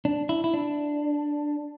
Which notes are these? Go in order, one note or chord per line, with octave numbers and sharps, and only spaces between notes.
D4
E4
E4
D4